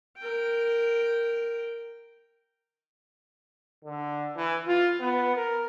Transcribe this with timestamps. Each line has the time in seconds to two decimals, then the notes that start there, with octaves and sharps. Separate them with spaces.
0.18 A#4 G5
3.84 D3
4.36 E3
4.67 F4
5.00 B3
5.36 A#4